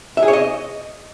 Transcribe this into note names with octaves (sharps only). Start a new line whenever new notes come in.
E5
G#4
C#5
D#5